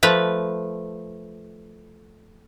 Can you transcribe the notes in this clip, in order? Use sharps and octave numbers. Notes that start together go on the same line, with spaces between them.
F3 A3 B4